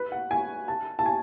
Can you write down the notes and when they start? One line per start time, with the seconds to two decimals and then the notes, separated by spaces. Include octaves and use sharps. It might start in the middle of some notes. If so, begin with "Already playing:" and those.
Already playing: B4
0.12 F#5
0.31 G#5
0.68 A5
0.99 A5
1.06 G#5